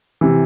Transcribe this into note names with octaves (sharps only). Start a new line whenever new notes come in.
C3 E3